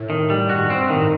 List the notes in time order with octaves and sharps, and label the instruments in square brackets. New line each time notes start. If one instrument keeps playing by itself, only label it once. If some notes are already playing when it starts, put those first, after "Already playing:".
Already playing: [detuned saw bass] A2
[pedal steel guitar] D#3
G3
[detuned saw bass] G2 [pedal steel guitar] F#4
[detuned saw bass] G2
[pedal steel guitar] C4
[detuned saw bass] G2
[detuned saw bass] A2 [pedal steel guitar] D#3